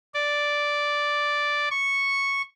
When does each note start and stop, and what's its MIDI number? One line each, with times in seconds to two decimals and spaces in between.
0.14 1.69 74
1.71 2.42 85